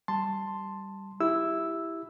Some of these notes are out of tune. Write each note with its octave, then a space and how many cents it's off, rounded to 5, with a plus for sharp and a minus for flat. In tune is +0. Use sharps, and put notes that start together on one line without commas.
G3 +0 A5 +5 C6 +0
E4 +0 G4 +0 E6 +0